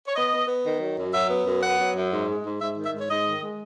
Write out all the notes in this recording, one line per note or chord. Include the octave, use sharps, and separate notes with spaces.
C#5
B3 D#5
B3
B3
D#3
F#3
F#2
F#3 E5
B3
F#2
B3 F#5
F#3
F#2
G#2
G#3
G#2
G#2 E5
D#3
E5
G#2
C#5
G#2 D#5
D#3
G#3